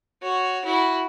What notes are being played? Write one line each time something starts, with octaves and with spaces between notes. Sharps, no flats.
F#4 C#5
E4 F#4